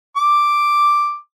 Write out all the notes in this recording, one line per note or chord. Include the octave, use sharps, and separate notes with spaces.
D6